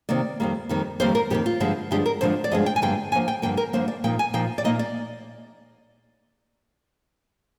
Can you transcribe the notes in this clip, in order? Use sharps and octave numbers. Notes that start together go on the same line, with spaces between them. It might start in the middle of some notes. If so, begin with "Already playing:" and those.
C3 D#3 A#3 D5
F2 D#3 G3 A#3
F2 D#3 G3 A#3
F2 D#3 G3 A#3 C5
A#4
F2 D#3 G3 A#3 G4
F4
G2 D3 F3 G#3 D4
G2 D3 F3 G#3 D4 G4
A#4
G2 D3 F3 G#3 D4 C5
D5
G2 D3 F3 G#3 D4 D#5
G5
G#5
G2 D3 F3 A#3 G5
G2 D3 F3 A#3 G#5
G5
G2 D3 F3 A#3 G5
A#4
G2 D3 F3 A#3 C5
D5
A#2 F3 A#3 D#4 G5
G#5
A#2 F3 A#3 D#4 G5
D5
A#2 F3 A#3 D#4 D#5
D5